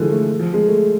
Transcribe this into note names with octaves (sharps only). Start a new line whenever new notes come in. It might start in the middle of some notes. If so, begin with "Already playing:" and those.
Already playing: D3 E3 F3 G#3
A3
F3
G#3
A3